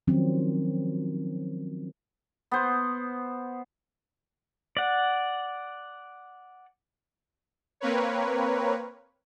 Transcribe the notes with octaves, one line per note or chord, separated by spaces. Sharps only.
D#3 F3 F#3 C4 C#4
B3 C5
D5 F#5
A#3 C4 A#4 B4 C#5